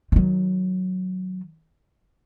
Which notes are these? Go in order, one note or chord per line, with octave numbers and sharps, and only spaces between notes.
D#3 F#3